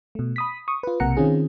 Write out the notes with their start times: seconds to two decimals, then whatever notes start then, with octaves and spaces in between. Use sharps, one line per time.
0.15 B2 A3
0.36 B5 D#6 B6
0.68 C#6 D#6
0.83 F4 B4
1.00 B1 C3 A#3 F#5 A#5 C#7
1.17 D#3 C4 C#4 F4 G#4